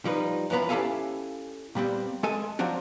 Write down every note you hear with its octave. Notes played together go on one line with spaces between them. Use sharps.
F3 G3 D#4 B4
F#2 E3 F3 B3 B4 A#5
C#4 E4 G4 A4 F5 G#5
A#2 G3 B3 C4
G#3 A4 G#5
F3 F#3 C4 D4 F#4